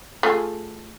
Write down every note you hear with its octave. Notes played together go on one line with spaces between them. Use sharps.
A3 F4 G#4